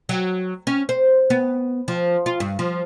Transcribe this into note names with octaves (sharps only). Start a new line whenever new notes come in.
F#3
C#4
C5
B3
F3
F4
G2
F3